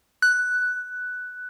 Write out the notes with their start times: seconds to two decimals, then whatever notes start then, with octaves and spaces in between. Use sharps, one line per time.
0.22 F#6